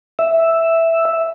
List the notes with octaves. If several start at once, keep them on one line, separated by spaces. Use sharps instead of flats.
E5